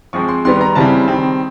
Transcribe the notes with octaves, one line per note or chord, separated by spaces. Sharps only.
F3 G#3 C4 C#6
C6
D#3 G3 B3 C6
A#5
C#3 E3 G3 C4 A5
D#3 G3 C4